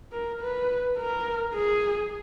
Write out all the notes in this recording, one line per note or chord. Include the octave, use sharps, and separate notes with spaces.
A#4
B4
A#4
G#4